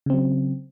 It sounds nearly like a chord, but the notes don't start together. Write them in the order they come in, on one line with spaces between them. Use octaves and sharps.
C#3 C4 F#3